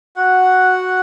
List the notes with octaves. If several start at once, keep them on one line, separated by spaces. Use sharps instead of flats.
F#4 F#5